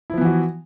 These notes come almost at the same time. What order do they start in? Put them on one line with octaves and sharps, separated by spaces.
E4 F3 B3 E3 F#4